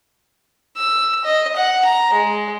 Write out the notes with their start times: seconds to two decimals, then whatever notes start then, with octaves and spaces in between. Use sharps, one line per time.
0.77 E6
1.24 D#5
1.56 F#5
1.84 A#5
2.13 G#3